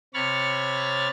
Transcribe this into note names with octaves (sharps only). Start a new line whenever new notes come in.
C3 C#5 B5 C#6 F6 A6